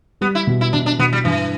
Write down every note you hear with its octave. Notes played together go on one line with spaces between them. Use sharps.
G3 B3
E4
B2
E4
B2 D4
D4
B2 B3
G3
G2 E3